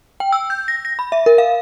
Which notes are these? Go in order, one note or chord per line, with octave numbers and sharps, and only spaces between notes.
G5
E6
G6
A#6
A#6
B5
E5
A#4
F5